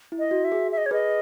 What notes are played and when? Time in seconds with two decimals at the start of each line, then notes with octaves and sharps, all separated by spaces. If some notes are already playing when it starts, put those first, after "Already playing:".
0.12 E4
0.19 D#5
0.31 F#4
0.44 E5
0.52 G#4
0.72 E5
0.78 D#5
0.86 C#5
0.91 G#4 B4 D#5